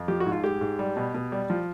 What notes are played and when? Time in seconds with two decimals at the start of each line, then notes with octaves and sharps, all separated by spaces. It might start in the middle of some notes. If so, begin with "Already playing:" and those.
Already playing: F2
0.08 F3 G4
0.20 F#4
0.26 G#2
0.32 F4
0.44 G#3 G4
0.61 G#2
0.79 G3
0.97 B2
1.14 B2
1.32 G3
1.50 F3